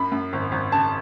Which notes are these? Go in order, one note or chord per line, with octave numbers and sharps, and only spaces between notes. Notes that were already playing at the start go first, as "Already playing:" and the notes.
Already playing: F#2 B5
F#2
G#1
G#1
C#3 A5